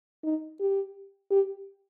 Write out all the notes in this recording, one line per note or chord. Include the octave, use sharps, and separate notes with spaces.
D#4
G4
G4